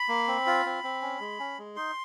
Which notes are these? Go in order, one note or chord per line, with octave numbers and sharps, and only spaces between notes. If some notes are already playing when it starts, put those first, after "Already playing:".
Already playing: B5
A#3
C4
F4
C4
C4
C#4
G#3
C#4
G#3
D#4 C6